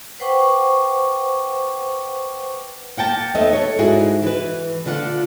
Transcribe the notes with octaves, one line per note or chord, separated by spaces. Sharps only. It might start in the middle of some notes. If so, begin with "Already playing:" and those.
B4 C5 F#5 G5 C#6 D6
A#3 F#5 G5 A5
D#2 A3 B3 D#5 E5
A4 C#5
G#2 E4 F#4 G#4
E3 B4
D3 A3 F4 F#5